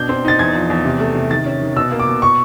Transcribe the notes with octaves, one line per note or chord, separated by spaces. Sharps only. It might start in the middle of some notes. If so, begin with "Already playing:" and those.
Already playing: B2 D4 G6
C4
D#4 A6
E2 G#6
F3
E2
C3
A3
C3
D#3 A6
C#4
D#3
B2 E6
A#3
D6
B2
C#6